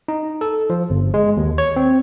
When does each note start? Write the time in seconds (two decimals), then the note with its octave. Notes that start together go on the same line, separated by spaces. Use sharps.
0.08 D#4
0.41 A4
0.70 F3
0.90 G1
1.14 G#3
1.37 D#2
1.58 C#5
1.76 C4